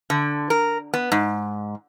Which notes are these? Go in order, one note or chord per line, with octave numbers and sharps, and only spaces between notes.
D3
A#4
B3
G#2